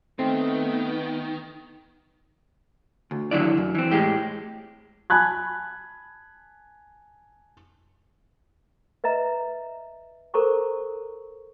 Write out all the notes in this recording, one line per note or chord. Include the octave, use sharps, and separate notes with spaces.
D#3 A3 B3 C4 G5
D2
D#2 D3 F#3 E4 D5
F#2
E3 C4
A2 G#3 G4
G#5 A5 B5 F#6 G#6
B4 D#5 E5 A#5
A4 A#4 C5 A#5 C#6 D6